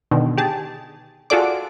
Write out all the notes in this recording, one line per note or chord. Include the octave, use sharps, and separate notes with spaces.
B2 D3 D#3
G4 G#4 A5
F4 F#4 G#4 A4 D5 D6